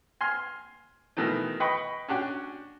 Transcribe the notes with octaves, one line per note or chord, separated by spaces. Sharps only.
G#5 C6 F6
B2 D#3 E3 A3
B4 D#5 G5 B5 C#6
C#4 D4 F#4 G5